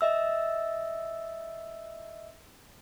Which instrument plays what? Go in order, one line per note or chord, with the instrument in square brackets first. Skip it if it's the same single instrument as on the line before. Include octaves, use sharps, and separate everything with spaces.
[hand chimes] D#5 E5 E6